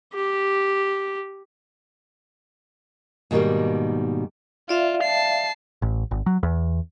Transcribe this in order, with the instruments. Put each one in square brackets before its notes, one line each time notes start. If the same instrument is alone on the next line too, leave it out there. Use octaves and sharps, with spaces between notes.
[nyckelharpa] G4
[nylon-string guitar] G#2 B2 D#3 E3 G3 A#3
[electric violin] F4 [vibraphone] D5 E5 F5
[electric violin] A5 C7
[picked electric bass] A1
G#1
F#3
E2